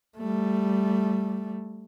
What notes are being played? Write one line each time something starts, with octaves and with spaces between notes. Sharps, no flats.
G3 A3